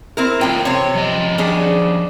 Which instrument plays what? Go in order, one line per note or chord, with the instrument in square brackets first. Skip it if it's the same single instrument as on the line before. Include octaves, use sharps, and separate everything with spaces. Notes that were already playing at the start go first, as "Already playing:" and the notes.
[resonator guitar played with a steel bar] C4 E4 A#4
[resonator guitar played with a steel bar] A2 G5 [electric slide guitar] E3 C#4 F4
[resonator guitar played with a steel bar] C3 C4 [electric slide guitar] C#5
[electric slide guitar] F3 G3 D#5
[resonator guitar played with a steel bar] C#4 D4 G#4